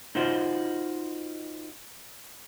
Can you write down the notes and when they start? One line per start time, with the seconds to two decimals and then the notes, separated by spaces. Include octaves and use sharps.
0.15 D#4 F4 F#4 C5 D#5